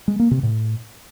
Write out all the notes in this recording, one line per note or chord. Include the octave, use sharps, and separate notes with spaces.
G#3
A#3
C3
A2